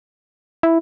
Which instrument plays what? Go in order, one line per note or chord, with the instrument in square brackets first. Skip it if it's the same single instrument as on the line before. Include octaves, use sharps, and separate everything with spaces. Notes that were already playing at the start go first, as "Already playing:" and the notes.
[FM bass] E4